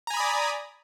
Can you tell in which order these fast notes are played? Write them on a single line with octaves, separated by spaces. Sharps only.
A#5 G#5 B5 D#6 D5